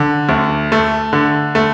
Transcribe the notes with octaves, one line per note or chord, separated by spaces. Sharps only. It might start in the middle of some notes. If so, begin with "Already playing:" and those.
Already playing: D3
D2
A3
D3
A3